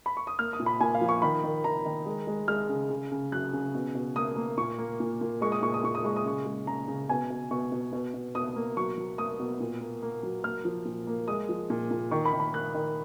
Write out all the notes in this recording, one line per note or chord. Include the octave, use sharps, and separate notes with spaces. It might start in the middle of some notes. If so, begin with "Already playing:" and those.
B5
C#6
D#6
A#3 F6
D#6
A#2
B5
A#2 G#5
F5
F3
C#6
D#3 B5
D#3
D#3 A#5
D#3
G#3
G#3
G#3 F6
C#3
C#3
C#3
F#3 F#6
C#3
B2
B2
A#3 D#6
A#3
A#2 C#6
A#3
A#2
A#2
G#3 C#6
D#6
A#2 C#6
D#6
A#2 C#6
D#6
G#3 C#6
D#6
C#3 C#6
G#3
C#3 A#5
C#3
B2 G#5
B2
B2 C#6
B2
B2
B2
B2 D#6
A#3
F#3 C#6
F#3
A#3 D#6
B2
A#2
A#3
A#3
F#3
A#3 F6
F3
A#2
A#3
G#3 D#6
F3
A#2
A#2
D#3 C#6
B5
D#3
B5
A#3 F#6
D#3